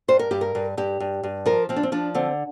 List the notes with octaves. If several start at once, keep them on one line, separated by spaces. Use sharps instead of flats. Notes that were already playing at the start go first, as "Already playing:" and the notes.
G2 C5
A#4
G2 G4
A#4
G2
G2 G4
G2
G2
F3 A#4
F3 C4
D4
C4
F3 D4
D3 C4